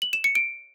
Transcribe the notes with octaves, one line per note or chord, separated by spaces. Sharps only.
F#7
E7
C#7
D7